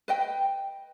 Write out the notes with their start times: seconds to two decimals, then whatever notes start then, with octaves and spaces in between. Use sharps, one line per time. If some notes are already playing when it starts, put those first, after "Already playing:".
0.08 B4 D#5 G5